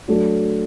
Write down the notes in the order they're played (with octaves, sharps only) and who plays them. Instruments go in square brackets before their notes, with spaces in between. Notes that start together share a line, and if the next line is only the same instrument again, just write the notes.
[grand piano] F#3 A3 D4